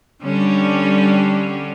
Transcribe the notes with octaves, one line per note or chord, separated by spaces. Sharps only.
D3 G3 C#4